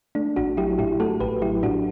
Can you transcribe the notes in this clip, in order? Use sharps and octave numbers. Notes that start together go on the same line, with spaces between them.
A3 D4
A1 D4 F#4
F#3 E4 G4
A2 E4 G4
A3 F#4 A4
A1 G4 B4
F#3 E4 G4
A2 D4 F#4